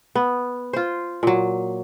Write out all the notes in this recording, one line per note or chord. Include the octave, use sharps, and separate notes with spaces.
B3
F4 C5
A#2 F#3